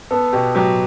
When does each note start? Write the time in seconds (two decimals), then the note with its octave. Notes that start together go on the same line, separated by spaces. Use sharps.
0.11 B3 A4
0.33 B2 G4
0.55 F#3 G4